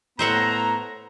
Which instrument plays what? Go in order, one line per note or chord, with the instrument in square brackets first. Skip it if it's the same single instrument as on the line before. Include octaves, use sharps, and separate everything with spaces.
[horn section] A2 B3 A#5 [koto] C5 E5 F#5